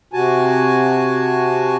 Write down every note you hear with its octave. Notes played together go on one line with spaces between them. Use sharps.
C3 F#4 G#5 A5